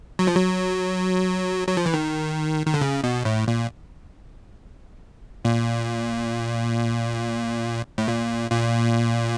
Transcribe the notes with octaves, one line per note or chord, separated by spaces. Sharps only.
F#3
F3
F#3
F#3
F3
E3
D#3
D#3
D3
C#3
B2
A2
A#2
A#2
A2
A#2
A#2